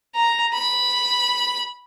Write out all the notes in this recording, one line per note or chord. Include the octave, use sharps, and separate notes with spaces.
A#5
B5